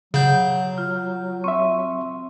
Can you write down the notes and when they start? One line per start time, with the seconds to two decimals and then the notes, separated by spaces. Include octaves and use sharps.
0.14 C#3 F#3 F#5 G6
0.78 F4
1.44 C4 E5 C#6